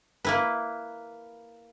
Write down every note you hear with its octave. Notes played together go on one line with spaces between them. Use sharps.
A#3 E4 B4